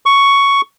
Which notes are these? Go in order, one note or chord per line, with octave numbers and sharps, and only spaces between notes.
C#6